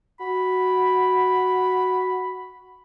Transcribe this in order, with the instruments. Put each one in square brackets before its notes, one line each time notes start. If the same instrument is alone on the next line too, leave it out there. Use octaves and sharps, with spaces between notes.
[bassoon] F#4 [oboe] B5